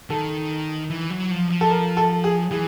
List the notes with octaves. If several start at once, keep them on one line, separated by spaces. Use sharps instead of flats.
D#3 A4
E3
F#3
F3
F3
A4
A#4
A4
G#4
E3 G#4